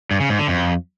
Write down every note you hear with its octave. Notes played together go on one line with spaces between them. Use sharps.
G2
C#3
G#2
D3
F2